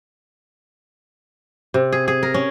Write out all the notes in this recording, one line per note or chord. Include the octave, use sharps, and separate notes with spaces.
C3
G#4
G#4
A#4
C#4